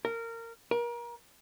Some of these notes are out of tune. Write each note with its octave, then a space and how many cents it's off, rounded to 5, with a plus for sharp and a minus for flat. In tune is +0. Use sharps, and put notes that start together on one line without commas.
A#4 -20
A#4 +30